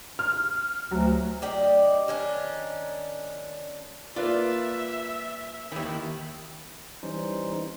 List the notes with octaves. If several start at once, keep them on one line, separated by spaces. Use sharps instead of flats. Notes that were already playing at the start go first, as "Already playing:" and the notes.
F6
D2 F#3
D4 G4 D5 D#5
D#3 C#4 D4
A#3 F4 B4 D5 E5
D#2 D#3 E4
E3 G3 C#4 D#4 C5